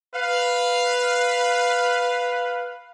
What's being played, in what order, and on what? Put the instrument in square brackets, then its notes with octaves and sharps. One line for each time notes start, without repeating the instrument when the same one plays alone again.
[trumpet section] B4 F5